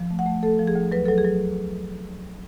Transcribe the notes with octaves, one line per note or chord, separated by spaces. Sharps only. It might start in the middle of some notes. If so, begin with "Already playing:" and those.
Already playing: F3
A3
F#5
A3
A3 A4
F3
G#4
D2
F#3 B4
F#3 A4
G#4
F#3